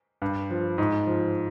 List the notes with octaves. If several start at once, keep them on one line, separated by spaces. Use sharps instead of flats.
G2
F3
G#2
F3